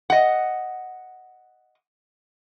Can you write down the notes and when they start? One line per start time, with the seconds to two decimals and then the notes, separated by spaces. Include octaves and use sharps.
0.10 D#5 F#5